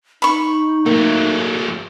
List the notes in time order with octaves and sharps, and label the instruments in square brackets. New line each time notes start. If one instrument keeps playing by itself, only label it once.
[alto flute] D#4 [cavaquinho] B5 C#6
[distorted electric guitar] F#3 A3 [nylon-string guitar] A#3